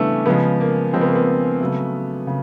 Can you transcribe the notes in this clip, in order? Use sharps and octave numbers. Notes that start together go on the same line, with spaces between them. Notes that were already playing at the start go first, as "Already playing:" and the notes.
Already playing: C#3 E3 G3 A3 B3 C#4 D4
C#3 F3 G#3 B3
A#3
C#3 F3 G#3 C4
B3
A#3
B3
C#3 F#3 A3
C#3